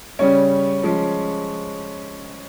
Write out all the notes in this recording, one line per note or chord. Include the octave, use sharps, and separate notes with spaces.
C#3 G3 C#4 C#5
F3 G#3 C#4